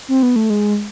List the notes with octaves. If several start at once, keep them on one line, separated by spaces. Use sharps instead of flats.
C4
B3
A3
G#3